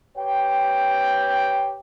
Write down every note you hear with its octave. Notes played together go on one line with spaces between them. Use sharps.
G4 B4 C#5 G5